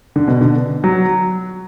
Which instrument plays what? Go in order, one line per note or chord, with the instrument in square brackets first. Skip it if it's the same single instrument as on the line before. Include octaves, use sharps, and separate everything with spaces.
[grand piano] D3
B2
D3
F#3